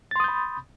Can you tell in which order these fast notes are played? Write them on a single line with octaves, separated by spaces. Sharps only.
A6 C6 D#6 G6 B5